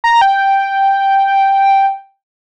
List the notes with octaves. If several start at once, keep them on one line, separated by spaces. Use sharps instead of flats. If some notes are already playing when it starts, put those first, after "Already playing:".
A#5
G5